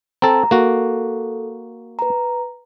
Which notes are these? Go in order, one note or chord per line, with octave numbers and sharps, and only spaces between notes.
C4 A4 A#5
A#3 F#4 A4
B4 A#5